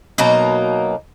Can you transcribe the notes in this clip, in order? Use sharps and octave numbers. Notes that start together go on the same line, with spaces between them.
B2 F#3 A#3 D#4